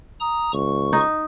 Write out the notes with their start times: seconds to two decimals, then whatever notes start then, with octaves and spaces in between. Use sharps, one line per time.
0.20 A#5 D#6
0.53 C#2 C#6
0.93 D#4